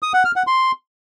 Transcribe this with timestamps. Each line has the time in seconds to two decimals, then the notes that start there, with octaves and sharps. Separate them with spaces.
0.03 D#6
0.14 F#5
0.25 F6
0.36 F#5
0.47 C6